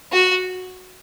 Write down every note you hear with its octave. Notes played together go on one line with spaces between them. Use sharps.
F#4